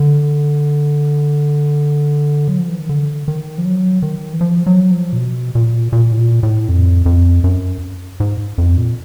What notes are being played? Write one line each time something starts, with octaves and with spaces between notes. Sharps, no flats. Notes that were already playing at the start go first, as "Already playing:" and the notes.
Already playing: D3
F#3
F3
E3
D#3
D3
D#3
F3
F#3
D#3
E3
F3
F#3
F3
A#2
B2
A#2
A#2
A2
A#2
A2
F2
F2
F#2
G#2
F2
A#2